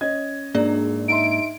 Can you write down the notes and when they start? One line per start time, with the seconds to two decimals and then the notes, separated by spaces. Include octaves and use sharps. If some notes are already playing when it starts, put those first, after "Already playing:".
0.01 C#4 D#5 G#6
0.55 G#2 A#3 D4 G#4 D5
1.08 D#4 E5 C6 D7